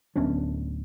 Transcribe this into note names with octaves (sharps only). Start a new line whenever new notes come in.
D1 B3 C#4 D4